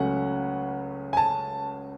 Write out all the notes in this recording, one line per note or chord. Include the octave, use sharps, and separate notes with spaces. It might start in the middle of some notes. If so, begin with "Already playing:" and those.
Already playing: C#2 C#3 F#3 A3 C#4 F#5
G#5
A5